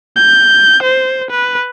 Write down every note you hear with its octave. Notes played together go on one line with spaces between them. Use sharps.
G6
C5
B4